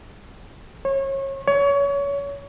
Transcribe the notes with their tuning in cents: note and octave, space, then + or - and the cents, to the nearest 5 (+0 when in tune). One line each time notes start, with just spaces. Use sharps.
C#5 -30
C#5 +25